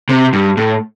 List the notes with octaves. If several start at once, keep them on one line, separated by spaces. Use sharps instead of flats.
C3
G2
A2